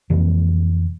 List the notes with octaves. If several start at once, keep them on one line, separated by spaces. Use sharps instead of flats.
F2 C3 E3 A#3